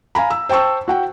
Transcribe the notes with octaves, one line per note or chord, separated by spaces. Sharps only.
F5 G#5 A#5 B5
E6
C5 G5 A5 C#6 E6
F#4 F#5 G5